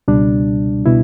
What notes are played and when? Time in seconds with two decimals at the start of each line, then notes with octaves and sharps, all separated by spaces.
0.08 C#2 B2 G3 D4
0.86 B2 E4